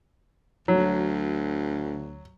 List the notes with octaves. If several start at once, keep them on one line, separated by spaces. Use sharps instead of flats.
D2 F#3